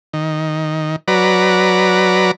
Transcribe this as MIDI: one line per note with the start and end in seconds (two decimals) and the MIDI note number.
0.13 0.96 51
1.08 2.31 54
1.08 2.31 71
1.08 2.31 74
1.08 2.31 82